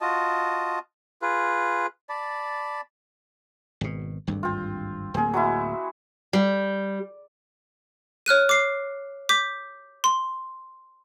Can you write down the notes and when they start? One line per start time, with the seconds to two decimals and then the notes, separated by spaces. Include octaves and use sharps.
0.01 F4 F#4 D#5 A5
1.22 F4 G#4 B4
2.09 D5 A5 B5
3.81 G#1 B2
4.27 G#1 D2 G2
4.43 C4 F4
5.14 D1 A#3 C4 G#4
5.34 F#3 G#3 E4
6.33 G3
8.26 C#5 F6 F#6 D#7
8.49 D6 C7
9.29 D6 G6 B6
10.04 C6